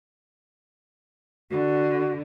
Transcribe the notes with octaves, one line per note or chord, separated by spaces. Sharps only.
D3 F#4